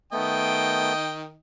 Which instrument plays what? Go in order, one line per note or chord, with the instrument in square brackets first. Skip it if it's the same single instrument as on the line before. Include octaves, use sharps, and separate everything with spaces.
[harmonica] D#3 D#5 G5 [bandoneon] A3 B3